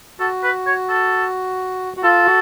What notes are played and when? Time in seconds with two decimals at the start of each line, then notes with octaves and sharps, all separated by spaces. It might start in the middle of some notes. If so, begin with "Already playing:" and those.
0.20 F#4 A4
0.43 B4
0.66 C#5
0.89 A4
1.97 F#4
2.03 F4 A4
2.26 F#4